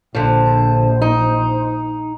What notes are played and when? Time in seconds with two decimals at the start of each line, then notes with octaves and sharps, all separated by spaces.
0.15 A#1 D3 F3 C5
1.02 D#4